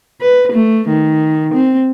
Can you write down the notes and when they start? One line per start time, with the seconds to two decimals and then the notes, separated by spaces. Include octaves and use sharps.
0.21 B4
0.53 A3
0.89 D#3
1.54 C4